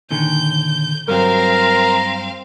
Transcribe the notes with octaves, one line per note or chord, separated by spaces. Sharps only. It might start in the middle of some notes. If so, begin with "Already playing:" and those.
A#2 D3 D#3 G6
G2 F#3 C4 A#4 F5 A#5